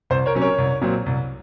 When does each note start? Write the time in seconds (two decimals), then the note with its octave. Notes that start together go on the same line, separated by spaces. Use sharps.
0.10 C2 C5
0.26 A#4 C#5
0.35 C3 F#3 C#4
0.42 A#4 C#5
0.58 C2
0.82 A#2 F#3 C4
1.06 C2